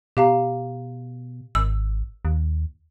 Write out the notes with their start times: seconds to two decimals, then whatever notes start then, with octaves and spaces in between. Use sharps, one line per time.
0.17 B2 G4 F5 A#5
1.55 G#1 E6
2.25 D#2